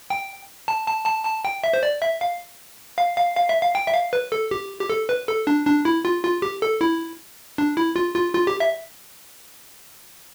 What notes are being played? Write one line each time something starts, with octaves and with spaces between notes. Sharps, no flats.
G5
A5
A5
A5
A5
G5
E5
C5
D5
E5
F5
F5
F5
F5
E5
F5
G5
E5
F5
B4
A4
G4
G4
A4
B4
A4
D4
D4
E4
F4
F4
G4
A4
E4
D4
E4
F4
F4
F4
G4
E5